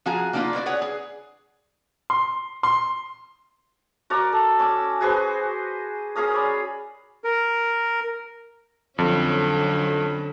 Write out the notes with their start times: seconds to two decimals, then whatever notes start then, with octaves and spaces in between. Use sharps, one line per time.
0.06 F3 F#4 G#4 G#5 A#5
0.33 A#3 B3 D4 D#4 F4 B4
0.53 E4 F#4 B4 D5
0.66 G#4 B4 C#5 F#5
0.82 G#4
2.10 C6
2.63 C6
4.10 F#4 A#4 D5 A#5
4.32 A4
4.59 C#4 D6 E6
5.01 F#4 G#4 B4 C5
6.15 C#4 G#4 A#4 D#6
6.33 C#5 D5 B5
7.24 A#4
8.98 F2 D3 F#3 C#4